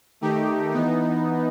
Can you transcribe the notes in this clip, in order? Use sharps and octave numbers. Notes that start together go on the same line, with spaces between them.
D#3 A3 D#4 G4
E3 B3 D#4